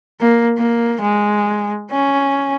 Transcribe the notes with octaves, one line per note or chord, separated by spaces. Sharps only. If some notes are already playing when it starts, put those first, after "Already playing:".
A#3
A#3
G#3
C#4